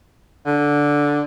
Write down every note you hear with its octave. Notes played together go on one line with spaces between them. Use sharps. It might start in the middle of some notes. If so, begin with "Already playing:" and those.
D3